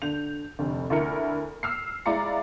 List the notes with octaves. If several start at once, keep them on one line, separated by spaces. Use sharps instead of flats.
D3 G6 F7
F1 D2
D2 E4 A#4 C#7
E6 F6 C7
G#3 E4 D5 F5 A#5 C#7